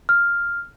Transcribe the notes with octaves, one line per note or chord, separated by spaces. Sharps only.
F6